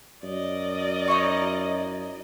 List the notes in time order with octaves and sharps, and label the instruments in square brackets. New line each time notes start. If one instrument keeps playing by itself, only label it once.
[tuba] F#2 [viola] D5 D#5
[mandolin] D#4 E4 C#6